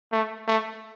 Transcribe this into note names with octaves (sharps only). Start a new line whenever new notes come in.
A3
A3